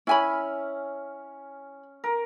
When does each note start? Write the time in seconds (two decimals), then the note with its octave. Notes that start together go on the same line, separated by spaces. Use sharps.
0.07 C#4 E4 G#5 B5
2.04 A#4